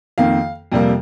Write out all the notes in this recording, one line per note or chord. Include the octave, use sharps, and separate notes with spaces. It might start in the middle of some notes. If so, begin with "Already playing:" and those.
F2 D#3 A#3 F5
F2 C3 G3 A#3